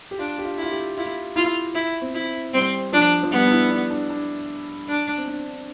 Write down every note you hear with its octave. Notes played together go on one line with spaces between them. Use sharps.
G4
D4 F4
G4
F4
E4 F4
G4
E4 F4
E4 F4
E4
C4
E4
G3 C4
F3 D4
F3
G3 B3
D4
E4
D4
D4
D4
D4
C4
D4